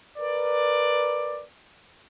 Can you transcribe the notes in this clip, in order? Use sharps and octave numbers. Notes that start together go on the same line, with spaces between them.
A#4 B4 D5